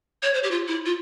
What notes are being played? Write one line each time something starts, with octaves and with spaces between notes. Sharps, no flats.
C#5
C5
G4
F4
E4
F4